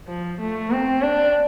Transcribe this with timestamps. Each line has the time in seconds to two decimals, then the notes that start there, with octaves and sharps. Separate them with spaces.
0.08 F3
0.40 A3
0.72 C4
1.02 D4